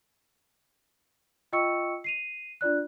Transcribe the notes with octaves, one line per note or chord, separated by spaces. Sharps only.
F4 D#5 G5 C#6 E6 C#7
C7 D#7 F7
D4 F4 D5 F#6